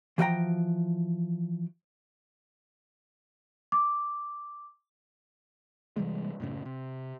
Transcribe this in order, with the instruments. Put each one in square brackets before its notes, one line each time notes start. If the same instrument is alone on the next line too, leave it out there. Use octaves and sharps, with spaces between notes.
[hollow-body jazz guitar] E3 F3 F#4 F5 G5 A#5
[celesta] D6
[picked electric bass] C3 E3 G3 G#3
F#2 A2 C#3
C3